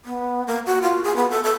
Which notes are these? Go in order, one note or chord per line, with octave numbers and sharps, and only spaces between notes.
B3
A#3
F#4
F4
G#4
B3
A4
A4